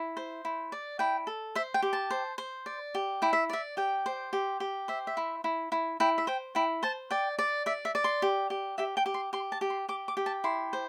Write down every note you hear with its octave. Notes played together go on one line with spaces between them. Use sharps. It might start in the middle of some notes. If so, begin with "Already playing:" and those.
Already playing: E4
C5
E4
D5
E4 G5
A4
C5 E5
G5
G4
A5
C5
C5
D5
G4
E4 G5
E5
D5 E5
G4 G5
C5
G4
G4
C5 E5
E5
E4
E4
E4
E4 G5
E5
C5 G5
E4 G5
C5 A5
D5 G5
D5
D5 E5
E5
D5
C6
G4
G4
G4 E5
G5
G4
C6
G4 C6
A5
G4
C6
G4 D6
D6
G4
A5
E4 C6
C5